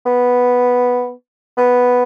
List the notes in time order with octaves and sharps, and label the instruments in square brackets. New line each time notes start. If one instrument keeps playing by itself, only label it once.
[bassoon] B3
B3